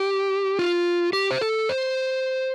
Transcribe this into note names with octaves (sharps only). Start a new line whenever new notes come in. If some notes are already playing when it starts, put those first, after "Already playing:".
Already playing: G4
F4
G4
C5
A4
C5